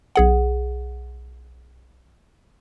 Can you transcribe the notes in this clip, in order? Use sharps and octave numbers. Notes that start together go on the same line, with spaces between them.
B1 G#4 F#5